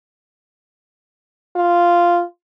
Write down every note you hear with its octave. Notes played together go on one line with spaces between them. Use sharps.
F4